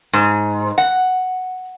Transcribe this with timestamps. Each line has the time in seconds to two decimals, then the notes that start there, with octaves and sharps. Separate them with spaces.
0.13 G#2
0.78 F#5